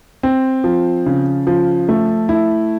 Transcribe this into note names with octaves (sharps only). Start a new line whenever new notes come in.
C4
F3
C#3
F3
A3
E4